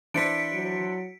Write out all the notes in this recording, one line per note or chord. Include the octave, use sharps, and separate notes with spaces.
E3 D4 E4 C5 B6 C#7 D7
F#3